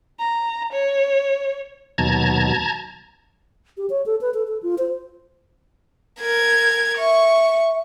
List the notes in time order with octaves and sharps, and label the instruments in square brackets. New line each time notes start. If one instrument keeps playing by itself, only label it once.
[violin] A#5
C#5
[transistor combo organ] D#2 B2 F#3 [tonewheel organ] A5 A#5 G#6
[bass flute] G4
C#5
A4
B4
A4
A4
F4
C5
[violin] A#4 G#6
[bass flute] E5 [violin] C#6